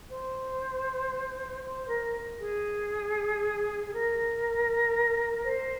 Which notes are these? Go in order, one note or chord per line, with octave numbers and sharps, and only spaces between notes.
C5
C5
A#4
G#4
G#4
A#4
C5